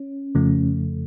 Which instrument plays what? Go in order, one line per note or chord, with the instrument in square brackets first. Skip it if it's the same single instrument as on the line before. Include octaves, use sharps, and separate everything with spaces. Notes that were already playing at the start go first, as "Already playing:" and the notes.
Already playing: [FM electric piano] C#4
F2 C#3 F3 A3